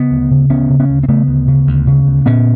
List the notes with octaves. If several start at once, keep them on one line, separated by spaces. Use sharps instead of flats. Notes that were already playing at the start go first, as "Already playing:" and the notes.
Already playing: C#3 B3
D2
C#3
D2 B3 C#4
C#3
B3 C#4
D2
C4
C#3 A3 B3
D2
C#3
D2
C#3
D2
A#2 B3 C#4